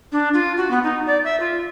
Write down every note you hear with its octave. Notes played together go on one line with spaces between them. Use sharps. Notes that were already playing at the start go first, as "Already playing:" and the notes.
D4
F4
F#4
B3
D#4
D5
E5
F4